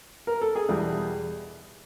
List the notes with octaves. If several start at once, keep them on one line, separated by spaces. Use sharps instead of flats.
A#4
A4
G#4
E2 B2 G3